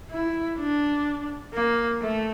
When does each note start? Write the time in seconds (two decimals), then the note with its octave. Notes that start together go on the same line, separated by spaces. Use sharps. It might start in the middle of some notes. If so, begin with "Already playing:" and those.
0.11 E4
0.59 D4
1.54 A#3
2.02 A3